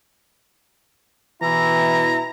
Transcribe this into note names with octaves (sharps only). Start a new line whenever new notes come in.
B2 E3 E4 A#5